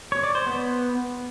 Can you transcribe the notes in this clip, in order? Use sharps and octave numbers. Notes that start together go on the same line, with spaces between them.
C#5
D5
C5
B3